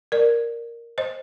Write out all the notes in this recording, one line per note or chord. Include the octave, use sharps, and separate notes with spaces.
A#4 D5
C5 D#5